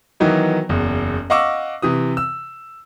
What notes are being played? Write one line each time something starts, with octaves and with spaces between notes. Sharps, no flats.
D#3 E3 F#3 B3 D#4
F#1 E2
D#5 F5 F#5 C#6 D6 E6
C3 E3 D#6
E6